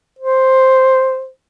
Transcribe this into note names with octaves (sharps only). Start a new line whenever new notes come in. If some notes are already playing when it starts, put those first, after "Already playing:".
C5